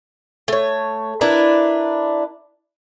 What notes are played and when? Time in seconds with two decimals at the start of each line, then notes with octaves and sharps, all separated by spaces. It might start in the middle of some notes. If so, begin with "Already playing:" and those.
0.48 A3 C#5
1.21 D4 E4 A#4 B4